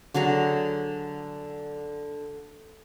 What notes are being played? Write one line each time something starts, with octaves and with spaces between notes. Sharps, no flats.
D3 F#3 G#4 A#5